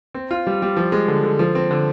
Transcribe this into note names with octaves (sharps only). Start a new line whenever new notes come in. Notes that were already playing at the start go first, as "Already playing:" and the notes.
C4
F4
G3
G3
F3
G#3
D3
D3
F3
C4
D3